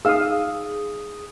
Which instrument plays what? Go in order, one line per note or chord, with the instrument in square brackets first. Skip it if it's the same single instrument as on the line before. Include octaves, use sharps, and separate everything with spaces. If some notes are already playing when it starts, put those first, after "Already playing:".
[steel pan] D#4 F5 E6 [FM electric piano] G#4 D#6